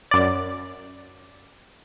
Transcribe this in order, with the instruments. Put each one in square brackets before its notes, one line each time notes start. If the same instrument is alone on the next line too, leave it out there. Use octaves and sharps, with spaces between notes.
[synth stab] F#2 D5